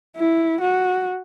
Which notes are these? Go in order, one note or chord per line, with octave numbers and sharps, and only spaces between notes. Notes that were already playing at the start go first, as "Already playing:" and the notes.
E4
F#4